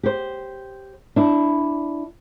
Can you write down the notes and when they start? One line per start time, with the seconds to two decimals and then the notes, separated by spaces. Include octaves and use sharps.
0.03 G4 C5
1.16 D4 E4